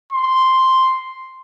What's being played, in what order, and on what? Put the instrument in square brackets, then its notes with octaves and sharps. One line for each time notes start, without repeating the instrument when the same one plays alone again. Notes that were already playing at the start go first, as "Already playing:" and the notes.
[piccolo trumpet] C6